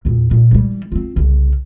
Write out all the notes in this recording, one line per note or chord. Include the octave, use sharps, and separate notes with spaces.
E2 A#2
A#2
E3 G3
C4 F4
C2 C#3